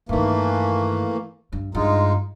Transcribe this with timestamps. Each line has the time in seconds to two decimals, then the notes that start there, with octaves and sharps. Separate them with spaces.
0.09 G2 D#3 E3 A3 A#3
1.52 G2
1.75 G2 G#3 D#4 F4